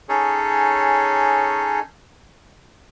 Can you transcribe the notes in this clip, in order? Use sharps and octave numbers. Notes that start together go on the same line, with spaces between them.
C#4 D#4 G#4 A4 C#5